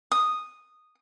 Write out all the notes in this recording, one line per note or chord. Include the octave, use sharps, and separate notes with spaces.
D#6